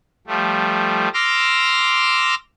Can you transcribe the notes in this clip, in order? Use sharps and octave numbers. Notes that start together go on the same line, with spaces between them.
F3 G3 A3
C6 D6 E6 F6 A#6